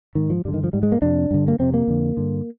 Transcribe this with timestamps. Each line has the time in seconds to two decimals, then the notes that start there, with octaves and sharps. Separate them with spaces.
0.15 G#2 D#3
0.30 F3
0.45 G2 D3 G3
0.54 D#3
0.64 F3
0.73 G#2 G3
0.83 G#3
0.92 A#3
1.02 F2 C3 D4
1.31 G2 D3
1.48 A#3
1.59 F2 C3 C4
1.74 A#3
1.87 F2 D3
2.17 G2 D3